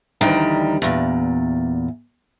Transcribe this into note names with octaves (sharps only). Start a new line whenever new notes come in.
D2 D#3 E3 G3 G5 A#5
E2 A#2